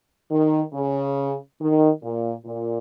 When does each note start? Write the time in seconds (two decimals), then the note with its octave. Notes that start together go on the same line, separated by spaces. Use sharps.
0.31 D#3
0.73 C#3
1.60 D#3
2.02 A#2
2.46 A#2